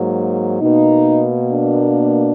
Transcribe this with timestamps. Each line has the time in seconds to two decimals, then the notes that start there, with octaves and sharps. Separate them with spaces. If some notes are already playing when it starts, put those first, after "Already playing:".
Already playing: G#2 F#3 A#3
0.62 B2 A#3 D#4
1.52 D4